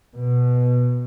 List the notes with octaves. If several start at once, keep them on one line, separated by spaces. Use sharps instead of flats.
B2